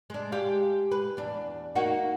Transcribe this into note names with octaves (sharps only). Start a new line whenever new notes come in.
G#3 D4
G#3 G4 F5
B4
E2 D4
A#3 D#4 F#4